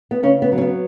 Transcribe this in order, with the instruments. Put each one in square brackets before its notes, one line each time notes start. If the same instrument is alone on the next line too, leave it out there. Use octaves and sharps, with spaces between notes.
[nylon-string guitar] B3
C#3 C#4
B3
F#3
C#4
B3